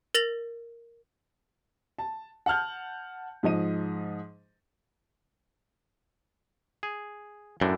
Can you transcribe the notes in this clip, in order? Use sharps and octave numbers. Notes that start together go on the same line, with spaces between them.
A#4 A6 A#6 F7 F#7
A5
F#5 A5 F6 G6
G#2 F3 D#5 D#7
G#4
F#2 A2 A3 D4